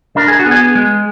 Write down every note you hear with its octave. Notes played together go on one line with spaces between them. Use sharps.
D4 A#4
G#4
F#4
B3
G#4
G#3